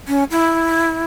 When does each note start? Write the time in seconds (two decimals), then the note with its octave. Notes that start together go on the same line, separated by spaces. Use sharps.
0.08 C#4
0.31 E4